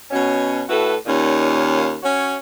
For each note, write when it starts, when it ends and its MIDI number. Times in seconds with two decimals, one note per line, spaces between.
0.11 0.63 47
0.11 0.63 61
0.69 0.95 45
0.69 0.95 64
0.69 0.95 66
0.69 0.95 69
0.69 0.95 71
1.06 1.95 39
1.06 1.95 46
1.06 1.95 51
1.06 1.95 61
2.03 2.35 61
2.03 2.35 66
2.03 2.35 73